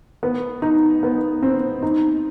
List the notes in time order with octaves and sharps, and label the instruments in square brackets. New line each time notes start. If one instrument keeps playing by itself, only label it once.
[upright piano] B3
D#4
B3
C4
D#4